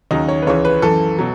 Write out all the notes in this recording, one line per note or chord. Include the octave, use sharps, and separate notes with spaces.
D#2 C#3 F#3 D#4
C#5
B4
C#2 C#3 E3 C#5
B4
F#2 E3 A4
B2 F#3